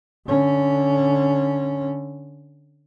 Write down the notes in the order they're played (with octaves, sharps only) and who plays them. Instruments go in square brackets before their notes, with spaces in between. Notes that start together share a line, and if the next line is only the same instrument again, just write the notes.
[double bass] D3 C#4